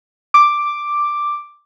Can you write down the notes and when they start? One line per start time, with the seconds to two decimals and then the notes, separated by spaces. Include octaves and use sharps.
0.34 D6